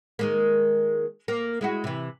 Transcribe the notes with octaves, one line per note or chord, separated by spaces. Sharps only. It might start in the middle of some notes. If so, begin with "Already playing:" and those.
D#3 G#3 A#3
A#3
G#3 E4 F#4
C3 E3